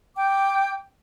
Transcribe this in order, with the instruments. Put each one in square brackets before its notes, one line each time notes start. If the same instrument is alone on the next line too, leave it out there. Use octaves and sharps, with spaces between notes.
[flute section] G5 D6